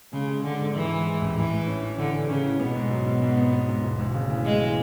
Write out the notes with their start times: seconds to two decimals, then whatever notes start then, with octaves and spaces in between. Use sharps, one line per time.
0.13 C#3 G#3
0.28 G#3
0.44 D3 G#3
0.59 G#2
0.75 G#2 E3
0.90 G#3
1.06 G#3
1.22 A1
1.36 A2 E3
1.52 A2
1.67 C#4
1.82 C#4
1.98 D3 E3
2.13 C#4
2.29 C#3 C#4
2.45 E3
2.60 B2 B3
2.76 G#2
2.91 F#3
3.06 G#2
3.22 G#2
3.37 B3
3.53 B3
3.68 G#2
3.83 E1
3.99 D2
4.14 C#3
4.30 E3
4.45 E3 G#3
4.61 E3